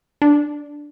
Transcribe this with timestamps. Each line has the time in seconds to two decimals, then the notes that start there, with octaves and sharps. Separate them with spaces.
0.22 D4